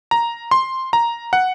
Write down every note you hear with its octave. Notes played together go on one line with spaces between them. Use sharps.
A#5
C6
A#5
F#5